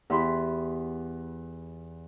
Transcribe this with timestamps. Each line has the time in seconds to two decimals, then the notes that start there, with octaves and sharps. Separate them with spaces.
0.10 E2 E4 G4 B5 C6